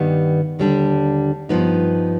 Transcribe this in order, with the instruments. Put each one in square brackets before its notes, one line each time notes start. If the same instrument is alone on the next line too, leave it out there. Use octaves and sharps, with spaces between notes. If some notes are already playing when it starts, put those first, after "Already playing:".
Already playing: [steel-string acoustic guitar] G2 D#3 G3 B3
D#2 D3 G3 D4
G2 F3 B3 D#4